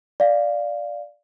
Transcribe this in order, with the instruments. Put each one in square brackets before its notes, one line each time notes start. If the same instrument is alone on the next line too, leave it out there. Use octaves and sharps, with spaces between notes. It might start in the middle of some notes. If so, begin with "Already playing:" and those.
[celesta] D5 F5